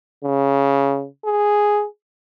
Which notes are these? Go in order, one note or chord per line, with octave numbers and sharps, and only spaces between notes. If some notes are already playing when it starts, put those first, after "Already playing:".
C#3
G#4